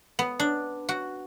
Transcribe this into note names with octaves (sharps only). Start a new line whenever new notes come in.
B3
D4
F#4